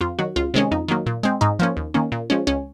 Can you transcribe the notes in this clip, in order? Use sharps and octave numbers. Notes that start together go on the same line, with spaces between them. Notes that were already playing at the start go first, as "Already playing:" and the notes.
F2 F4
D#3 F#3 F#4
C#2 F4
C3 D#3 G#3 C#4
F2 D#4
D#3 F#3 A#3
A#2
G#3 C4
G#2 D#4
F3 A#3 C#4
D#2
D#3 A#3 C#4
A#2
F3 G#3 C#4
C#2 C#4